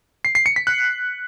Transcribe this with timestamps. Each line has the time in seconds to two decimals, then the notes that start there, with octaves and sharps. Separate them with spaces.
0.25 C7
0.35 C7
0.46 C#7
0.56 B6
0.67 F#6